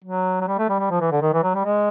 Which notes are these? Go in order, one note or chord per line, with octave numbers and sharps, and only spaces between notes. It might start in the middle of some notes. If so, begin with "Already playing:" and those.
F#3
F#3
G3
A3
G3
G3
F3
E3
D3
D#3
E3
F#3
G3
G#3